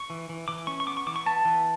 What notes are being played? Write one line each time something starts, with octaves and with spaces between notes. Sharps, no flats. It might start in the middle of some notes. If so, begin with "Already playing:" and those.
Already playing: C#6
E3
E3
E3 D6
C#4 C#6
C#6
B3 D6
C#6
E3 D6
C#6
B3 A5
E3